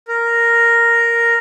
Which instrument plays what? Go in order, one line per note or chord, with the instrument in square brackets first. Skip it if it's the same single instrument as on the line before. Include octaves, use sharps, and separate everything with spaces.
[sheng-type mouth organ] A#4